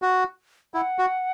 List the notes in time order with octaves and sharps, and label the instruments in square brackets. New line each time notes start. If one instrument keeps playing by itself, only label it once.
[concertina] F#4
[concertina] E4 [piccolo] F#5
[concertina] F#4